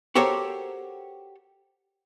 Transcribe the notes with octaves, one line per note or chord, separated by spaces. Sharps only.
F#4 G4 A4 A#4 C5 C#5